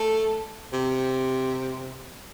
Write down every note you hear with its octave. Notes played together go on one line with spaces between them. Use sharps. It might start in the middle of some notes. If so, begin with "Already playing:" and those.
Already playing: A3
C3